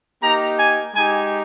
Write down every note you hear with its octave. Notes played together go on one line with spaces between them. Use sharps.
A#3 D#4 G4 A#5
G#5
G#3 D#4 G4 G#5